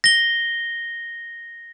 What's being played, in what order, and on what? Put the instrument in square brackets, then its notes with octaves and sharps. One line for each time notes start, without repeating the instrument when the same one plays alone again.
[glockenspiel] A#6 G7